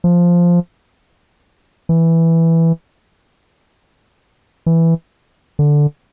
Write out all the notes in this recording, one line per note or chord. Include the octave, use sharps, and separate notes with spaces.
F3
E3
E3
D3